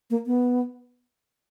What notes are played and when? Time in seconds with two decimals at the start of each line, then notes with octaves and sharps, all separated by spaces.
0.10 A#3
0.26 B3